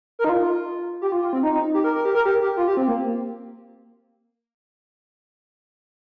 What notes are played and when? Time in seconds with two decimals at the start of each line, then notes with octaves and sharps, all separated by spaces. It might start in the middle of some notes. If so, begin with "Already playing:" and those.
0.19 A#4
0.24 D#4
0.29 F4
1.02 G4
1.12 F4
1.23 F4
1.33 C4
1.43 D#4
1.53 D#4
1.74 G4
1.84 A#4
1.95 A#4
2.05 G4
2.15 A#4
2.26 G4
2.42 G4
2.57 F4
2.68 G4
2.77 C4
2.88 A#3